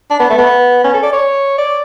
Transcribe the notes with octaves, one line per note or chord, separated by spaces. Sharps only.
D4
B3
A3
B3
C#4
A4
D5
C#5
D5